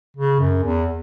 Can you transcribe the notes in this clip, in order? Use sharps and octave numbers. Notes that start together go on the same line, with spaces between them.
C#3
F#2
E2